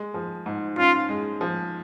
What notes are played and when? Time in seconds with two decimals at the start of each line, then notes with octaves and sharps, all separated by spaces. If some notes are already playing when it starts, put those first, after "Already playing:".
Already playing: G#3
0.14 F3
0.46 G#2
0.77 C#4 F4
1.09 G#3
1.41 F3